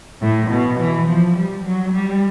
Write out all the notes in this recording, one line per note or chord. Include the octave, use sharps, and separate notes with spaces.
A2
B2
E3
F3
G3
F#3
G3